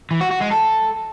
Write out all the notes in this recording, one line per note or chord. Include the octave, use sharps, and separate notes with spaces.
E3
F#4
F#4
G#3
A4